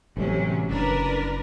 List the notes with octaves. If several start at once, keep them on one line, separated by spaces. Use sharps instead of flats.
A1 C3 F#3 G3 C#4
F#1 D4 A#4 B4